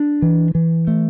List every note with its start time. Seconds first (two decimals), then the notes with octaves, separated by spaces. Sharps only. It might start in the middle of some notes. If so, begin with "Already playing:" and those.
Already playing: D4
0.22 E3
0.55 E3
0.87 A3